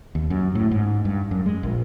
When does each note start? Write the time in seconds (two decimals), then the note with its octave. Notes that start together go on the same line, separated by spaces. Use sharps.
0.15 D#2
0.30 F#2
0.55 A2
0.71 G#2
1.05 G2
1.31 F#2
1.46 G#3
1.63 A#1